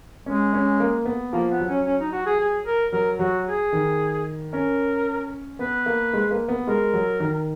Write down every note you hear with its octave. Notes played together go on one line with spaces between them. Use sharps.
G#3 C#4
C#4
A#3
B3
F3 A#3
B3
F#3
C#4
C#4
D#4
F#4
G#4
G#4
A#4
F#3 A#4
F#3 F#4
G#4
D#3
C#4 A#4
B3 B4
A#3
G#3
A#3
B3
G#3 A#4
F#3
D#3